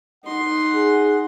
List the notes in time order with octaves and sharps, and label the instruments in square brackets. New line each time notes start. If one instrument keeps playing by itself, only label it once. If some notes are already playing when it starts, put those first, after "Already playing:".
[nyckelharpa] D#4 C6 [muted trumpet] F#5
[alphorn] G#4